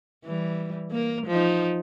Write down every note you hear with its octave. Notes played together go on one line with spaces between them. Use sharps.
E3 G3
A#3 A#4
F3 D#4